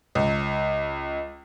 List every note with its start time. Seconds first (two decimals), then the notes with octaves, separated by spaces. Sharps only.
0.15 C#2